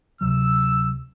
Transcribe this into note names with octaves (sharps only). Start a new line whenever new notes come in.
D2 C3 F#3 E6